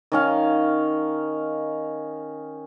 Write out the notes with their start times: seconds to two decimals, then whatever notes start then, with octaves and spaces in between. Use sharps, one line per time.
0.12 D#3 C#4 F5